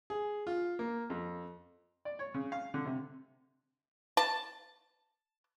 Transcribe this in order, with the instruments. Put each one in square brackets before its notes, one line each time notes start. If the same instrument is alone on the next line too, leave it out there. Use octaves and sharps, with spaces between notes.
[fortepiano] G#4
F4
A#3
F2
D5
C#5
C#3
F5
D3
C3
[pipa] A5